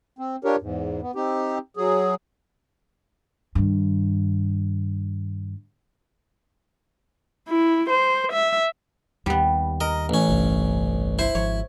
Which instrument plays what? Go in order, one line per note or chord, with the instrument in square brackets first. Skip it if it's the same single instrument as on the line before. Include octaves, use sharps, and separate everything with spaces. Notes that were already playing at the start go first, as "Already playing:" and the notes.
[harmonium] C4
D4 F4 G4 A#4 C#5
E2 G#2
B3
C4 D#4 G4
F#3 G#4
[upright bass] G2 D#3
[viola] E4
C5
E5
[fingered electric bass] D#2 [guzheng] G3 B3
[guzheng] A#4 [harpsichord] D#5
[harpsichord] A1 C#4
[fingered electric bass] G1 C2 G2
[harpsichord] E4 [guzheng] C5
[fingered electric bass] G#1 F3 [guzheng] C#5